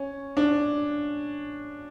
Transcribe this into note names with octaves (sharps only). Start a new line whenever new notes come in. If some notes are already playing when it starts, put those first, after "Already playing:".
Already playing: C#4
D4